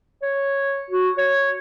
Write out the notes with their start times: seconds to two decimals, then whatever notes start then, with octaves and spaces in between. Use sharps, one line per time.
0.22 C#5
0.90 F#4
1.18 C#5